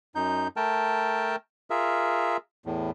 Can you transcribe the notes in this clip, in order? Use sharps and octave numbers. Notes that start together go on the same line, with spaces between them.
F#2 D#4 G6
A3 A#4 G5 A5
F4 G#4 A#4 E5
E2 A2